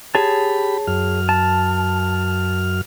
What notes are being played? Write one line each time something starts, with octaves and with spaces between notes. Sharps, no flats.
G4 G#4 C#5 A5 B5
F#2 F6
A5